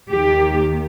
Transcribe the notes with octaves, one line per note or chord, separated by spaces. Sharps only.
D#2 D#3 G4